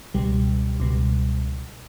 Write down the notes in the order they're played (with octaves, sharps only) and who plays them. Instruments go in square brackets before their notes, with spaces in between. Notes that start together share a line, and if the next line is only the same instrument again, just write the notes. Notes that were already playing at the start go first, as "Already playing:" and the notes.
[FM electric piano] C#2 B2 G3
C#2 B2 G3